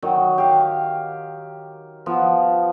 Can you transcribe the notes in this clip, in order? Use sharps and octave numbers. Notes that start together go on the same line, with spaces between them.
D#3 F#3
G4 F5
F3 B3